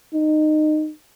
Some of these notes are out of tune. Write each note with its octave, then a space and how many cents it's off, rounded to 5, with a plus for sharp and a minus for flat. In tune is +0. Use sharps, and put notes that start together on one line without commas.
D#4 -20